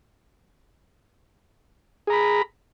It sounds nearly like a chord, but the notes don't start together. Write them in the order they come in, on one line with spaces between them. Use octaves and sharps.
G#4 A#5 B5